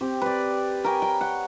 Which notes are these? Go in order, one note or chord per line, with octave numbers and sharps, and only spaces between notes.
C4 G4
B4 D5
A#4 C#5 G5 G#5
G5 B5
F#5